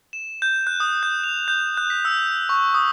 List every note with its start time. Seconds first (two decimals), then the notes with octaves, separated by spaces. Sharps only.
0.13 E7
0.42 G6
0.67 F#6
0.80 D#6
1.03 G6
1.24 F7
1.48 G6
1.77 F#6
1.90 B6
2.05 E6
2.49 C#6
2.74 D#6